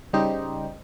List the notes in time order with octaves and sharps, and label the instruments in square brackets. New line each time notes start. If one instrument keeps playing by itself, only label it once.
[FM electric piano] C#3 G3 D#4 G4 C5